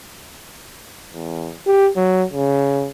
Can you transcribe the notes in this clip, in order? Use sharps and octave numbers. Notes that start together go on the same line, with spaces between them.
E2
G4
F#3
C#3